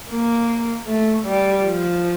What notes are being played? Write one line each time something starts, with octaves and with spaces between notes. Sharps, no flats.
A#3
A3
G3
F3